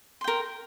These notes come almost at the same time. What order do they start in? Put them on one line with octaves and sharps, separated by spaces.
C6 G5 A#4